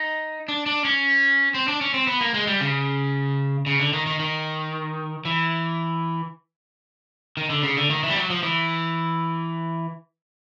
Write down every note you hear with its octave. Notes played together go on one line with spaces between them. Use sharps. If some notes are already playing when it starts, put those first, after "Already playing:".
Already playing: D#4
D4
D4
C#4
C4
D4
C#4
C4
B3
A#3
G#3
G3
C#3
C#3
D3
D#3
D#3
D#3
E3
D#3
D3
C#3
D3
D#3
E3
G3
F#3
F3
E3